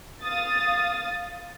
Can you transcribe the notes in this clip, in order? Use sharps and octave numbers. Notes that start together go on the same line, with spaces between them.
F5 D#6 A6